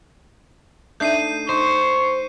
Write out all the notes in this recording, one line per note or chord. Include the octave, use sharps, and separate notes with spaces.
A3 D4 D#4 G6 C7 D#7
D#4 C5 C#6